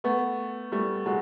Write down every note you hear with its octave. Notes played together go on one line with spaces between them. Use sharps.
A3 B3
G3 A3
F#3 G#3